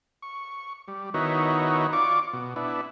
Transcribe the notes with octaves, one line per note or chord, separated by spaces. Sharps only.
C#6
G3
D#3 B3 D#4 E4 F#4 C#5
F4 D5 C#6 D6
B2
B3 D4 E4